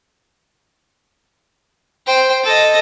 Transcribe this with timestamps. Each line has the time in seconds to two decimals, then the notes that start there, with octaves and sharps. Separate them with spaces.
2.06 C5 G5
2.43 A4 D#5